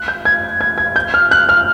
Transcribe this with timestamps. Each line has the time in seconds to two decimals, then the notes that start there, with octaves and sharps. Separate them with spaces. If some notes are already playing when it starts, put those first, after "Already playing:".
Already playing: F#6
0.08 G6
0.25 G#6
0.61 G#6
0.78 G#6
0.96 G6
1.14 F6
1.31 F#6
1.49 F6